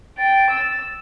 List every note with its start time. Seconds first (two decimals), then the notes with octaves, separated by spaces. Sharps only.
0.18 G5 A6
0.50 E6